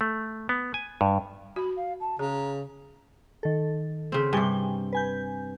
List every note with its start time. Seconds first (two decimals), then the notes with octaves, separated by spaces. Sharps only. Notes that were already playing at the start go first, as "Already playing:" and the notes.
0.01 A3
0.49 B3
0.74 G#5
1.01 G2
1.56 F#4 B5
1.76 F5
2.00 A5
2.19 C#3 G#4 A#5
3.43 D#3 A4
4.12 C#3 C4
4.33 G2 C3 G5 G#5 G7
4.93 B4 G#5 G6